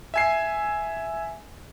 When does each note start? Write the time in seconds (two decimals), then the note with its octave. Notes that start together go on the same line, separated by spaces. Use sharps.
0.14 E5 G#5 C7